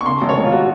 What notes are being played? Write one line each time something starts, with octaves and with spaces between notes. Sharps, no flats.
C#6
C#3 C6
G#1
C#5
G#1
F4
F#4